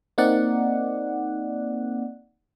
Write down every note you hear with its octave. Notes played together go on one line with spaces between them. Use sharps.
A#3 C4 D#4 D5 F#5